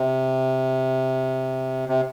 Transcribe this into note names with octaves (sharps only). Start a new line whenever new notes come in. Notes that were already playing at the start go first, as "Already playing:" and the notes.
Already playing: C3
C3